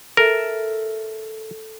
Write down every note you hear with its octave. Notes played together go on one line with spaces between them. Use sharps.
A4 A#4 E5